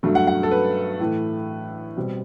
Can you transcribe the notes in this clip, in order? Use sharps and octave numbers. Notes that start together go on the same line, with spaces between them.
G2 F#3 A3
F#5
F#5
A4
B4
A2 E3 A3
B2 G3 C4